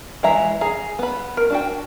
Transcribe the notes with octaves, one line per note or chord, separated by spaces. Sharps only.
E3 G#3 E5 A#5
G#4 A#5
B3 B5
A#4
D4 F#4 G5